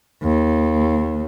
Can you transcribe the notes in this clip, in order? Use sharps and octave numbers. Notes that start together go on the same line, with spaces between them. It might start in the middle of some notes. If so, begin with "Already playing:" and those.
D#2